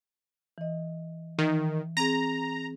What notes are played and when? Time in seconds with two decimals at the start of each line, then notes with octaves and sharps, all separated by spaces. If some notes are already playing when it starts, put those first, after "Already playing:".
0.58 E3 D#5
1.39 D#3 E3
1.97 C4 G#4 A#5